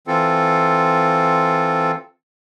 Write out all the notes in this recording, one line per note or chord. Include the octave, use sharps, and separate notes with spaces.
E3 C4 F4 A4